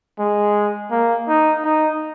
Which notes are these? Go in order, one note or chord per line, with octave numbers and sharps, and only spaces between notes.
G#3
A#3
D#4
D#4